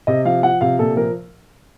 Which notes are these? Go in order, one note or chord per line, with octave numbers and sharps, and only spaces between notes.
C3 D#5
F3 F5
F3 F#5
C3 F5
A#2 A4
F3 A#4